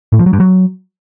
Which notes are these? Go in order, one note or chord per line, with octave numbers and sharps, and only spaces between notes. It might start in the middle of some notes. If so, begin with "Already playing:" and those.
A2
F3
F#3
G2
F#3